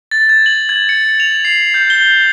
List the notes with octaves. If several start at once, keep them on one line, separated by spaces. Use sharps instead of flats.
A6
G#6
F#7
G#6
C#7
F7
C7
G6
G7